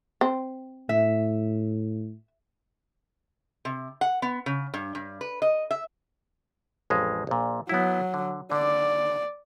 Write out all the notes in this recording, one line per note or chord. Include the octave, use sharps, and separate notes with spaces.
C4
A2 E5
C3
F#5
B3
C#3
G2
G2
B4
D#5
E5
A1 F2 G#3
A#1 A#2
F#3 B3 E4
D3
D3 D5